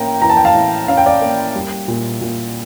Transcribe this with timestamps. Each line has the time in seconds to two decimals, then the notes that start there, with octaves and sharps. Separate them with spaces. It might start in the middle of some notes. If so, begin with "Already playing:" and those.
Already playing: A2 A#3 C#4 G5 A#5
0.22 E3 A#5
0.30 A5
0.37 G5
0.45 F5 A5
0.55 A2
0.88 C#4 F5
0.97 G5
1.06 D5 F5
1.22 A#3
1.55 G3
1.88 A#2
2.21 A#2